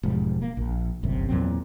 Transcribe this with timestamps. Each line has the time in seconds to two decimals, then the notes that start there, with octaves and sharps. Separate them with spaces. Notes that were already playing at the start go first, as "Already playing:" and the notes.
0.03 E1 G#2 F3 G3
0.42 A#3
0.57 A#1
1.03 G1 C2 F#2 C3
1.29 E2 A#2 F#3 C4